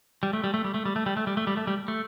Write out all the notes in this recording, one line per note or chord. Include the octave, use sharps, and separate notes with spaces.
G3
A3
G3
A3
G3
A3
G3
A3
G3
A3
G3
A3
G3
A3
G3
A3